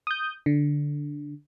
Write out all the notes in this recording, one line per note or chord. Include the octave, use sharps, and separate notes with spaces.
D#6 G6
D3